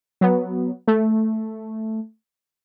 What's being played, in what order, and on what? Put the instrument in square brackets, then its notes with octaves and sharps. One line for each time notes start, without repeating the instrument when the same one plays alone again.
[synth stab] F#3 B3
A3